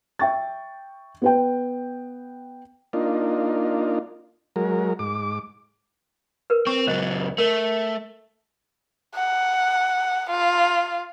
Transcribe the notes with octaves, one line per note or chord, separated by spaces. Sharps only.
E5 G5 C#6 A6
B3 B4 G5
A#3 D4 D#4 F4
F#3 G#3 A#4
G#2 D6
A#4 B4
C4 C#6
C#2 F#3 C5 D#5
A3 A#4
F#5
F4